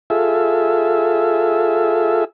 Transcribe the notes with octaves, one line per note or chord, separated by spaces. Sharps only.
F4 G#4 A4 E5